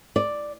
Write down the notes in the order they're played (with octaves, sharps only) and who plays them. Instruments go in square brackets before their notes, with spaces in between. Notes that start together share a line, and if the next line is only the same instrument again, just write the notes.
[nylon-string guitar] D5